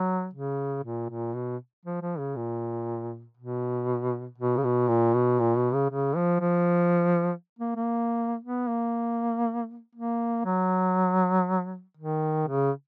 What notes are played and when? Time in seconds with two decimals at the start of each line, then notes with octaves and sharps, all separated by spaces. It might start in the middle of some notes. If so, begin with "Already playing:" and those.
Already playing: F#3
0.34 C#3
0.84 A#2
1.10 A#2
1.34 B2
1.86 F3
2.02 F3
2.18 C#3
2.36 A#2
3.37 B2
4.38 B2
4.57 C#3
4.64 B2
4.89 A#2
5.14 B2
5.40 A#2
5.57 B2
5.74 C#3
5.90 C#3
6.16 F3
6.41 F3
7.59 A#3
7.76 A#3
8.43 B3
8.68 A#3
9.95 A#3
10.45 F#3
11.97 D#3
12.48 C#3